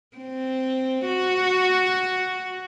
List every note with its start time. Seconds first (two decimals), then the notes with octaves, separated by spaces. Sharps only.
0.17 C4
1.05 F#4